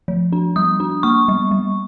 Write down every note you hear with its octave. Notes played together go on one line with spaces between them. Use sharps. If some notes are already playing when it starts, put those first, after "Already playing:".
F3
D4
G3 D#6
D4
A#3 C#6
G3
G3